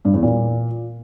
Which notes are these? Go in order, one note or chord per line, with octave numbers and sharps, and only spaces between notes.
G2
E2
A#2